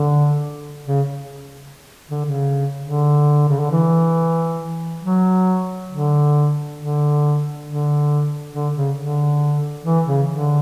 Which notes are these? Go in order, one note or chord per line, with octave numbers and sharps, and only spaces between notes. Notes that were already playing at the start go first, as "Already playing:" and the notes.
Already playing: D3
C#3
D3
C#3
D3
C#3
D3
E3
F#3
D3
D3
D3
D3
C#3
D3
E3
C#3
D3